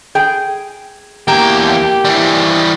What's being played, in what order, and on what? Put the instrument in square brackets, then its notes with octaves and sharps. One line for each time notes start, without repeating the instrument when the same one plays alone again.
[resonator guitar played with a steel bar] G#4 G5
[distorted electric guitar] E2 G5 [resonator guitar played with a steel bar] A#3 [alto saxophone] G4
[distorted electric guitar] E3 G3